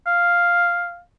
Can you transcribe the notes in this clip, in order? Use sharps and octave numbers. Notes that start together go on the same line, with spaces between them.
F5